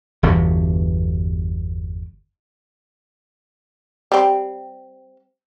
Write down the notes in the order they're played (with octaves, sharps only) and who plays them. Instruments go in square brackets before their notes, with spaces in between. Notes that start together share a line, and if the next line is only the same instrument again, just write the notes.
[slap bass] G1 E2 B2 D3
[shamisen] G3 C4